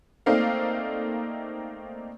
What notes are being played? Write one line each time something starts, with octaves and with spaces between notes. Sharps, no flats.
A3 A#3 C4 D#4 D5 F5